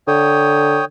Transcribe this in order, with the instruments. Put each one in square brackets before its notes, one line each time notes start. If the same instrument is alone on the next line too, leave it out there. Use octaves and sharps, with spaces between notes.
[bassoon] D3 [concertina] C#5 G5 D#6